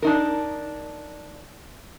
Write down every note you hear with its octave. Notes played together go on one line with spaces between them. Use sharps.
D4 D#4 A#4